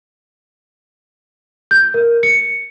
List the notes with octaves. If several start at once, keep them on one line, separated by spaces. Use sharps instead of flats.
G6
A#4
C#7